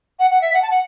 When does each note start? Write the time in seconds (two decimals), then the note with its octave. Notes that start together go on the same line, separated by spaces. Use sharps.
0.19 F#5
0.31 F#5
0.42 E5
0.54 F#5
0.62 A5
0.71 F#5